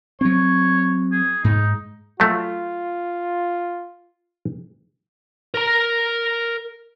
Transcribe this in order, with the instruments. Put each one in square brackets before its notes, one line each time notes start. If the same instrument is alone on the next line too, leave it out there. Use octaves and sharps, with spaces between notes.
[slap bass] F#3 C4 [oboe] C#5
[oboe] G#4
[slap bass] G#2 [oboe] D#4
[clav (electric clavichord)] F#3 A3 [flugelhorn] F4
[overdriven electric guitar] A#4 A#5